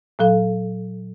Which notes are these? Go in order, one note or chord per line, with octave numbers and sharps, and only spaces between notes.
A#2 F#3 A4 F5